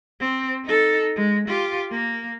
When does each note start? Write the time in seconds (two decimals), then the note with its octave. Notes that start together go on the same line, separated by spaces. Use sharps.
0.20 C4
0.65 D#4 A4
1.16 G#3
1.48 F4 G4
1.91 A#3